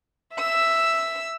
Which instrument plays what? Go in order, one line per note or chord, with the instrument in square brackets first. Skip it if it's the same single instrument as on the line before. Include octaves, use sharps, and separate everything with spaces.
[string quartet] E5 E6